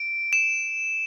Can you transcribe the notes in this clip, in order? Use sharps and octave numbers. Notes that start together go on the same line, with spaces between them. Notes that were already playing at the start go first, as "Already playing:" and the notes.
Already playing: D7
E7